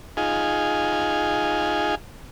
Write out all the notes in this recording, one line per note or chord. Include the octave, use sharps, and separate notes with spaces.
D#4 F4 G#4